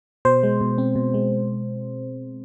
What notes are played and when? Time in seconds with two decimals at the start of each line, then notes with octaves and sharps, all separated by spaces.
0.25 B2 C5
0.43 G#3
0.61 B2
0.78 C4
0.96 B2
1.14 G#3